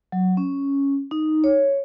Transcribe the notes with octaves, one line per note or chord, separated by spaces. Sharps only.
F#3
C#4
D#4
C#5